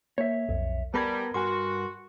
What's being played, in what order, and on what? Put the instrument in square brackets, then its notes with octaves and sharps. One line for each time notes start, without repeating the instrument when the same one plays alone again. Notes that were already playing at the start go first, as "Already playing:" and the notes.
[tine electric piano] A#3 [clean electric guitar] C#5 E5
[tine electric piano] B1 F2
[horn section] G3 [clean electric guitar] B3 A#4 [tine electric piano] A5 B5 G#6
[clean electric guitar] G2 A#4 G#5 [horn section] F#4 [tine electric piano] C6